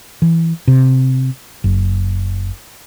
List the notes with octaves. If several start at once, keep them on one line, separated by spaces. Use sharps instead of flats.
E3
C3
F#1